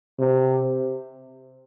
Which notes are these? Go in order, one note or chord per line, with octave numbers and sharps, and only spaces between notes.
C3